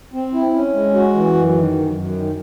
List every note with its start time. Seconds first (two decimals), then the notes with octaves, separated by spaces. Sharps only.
0.13 C4
0.34 E4
0.54 C#4
0.74 G#3
0.95 F#4
1.15 E3
1.35 F#2
1.55 D#3
1.75 F#2
1.95 F#2
2.16 D#3